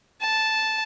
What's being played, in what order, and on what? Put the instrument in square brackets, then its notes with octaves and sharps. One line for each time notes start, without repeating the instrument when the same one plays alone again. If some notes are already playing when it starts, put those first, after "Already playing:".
[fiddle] A5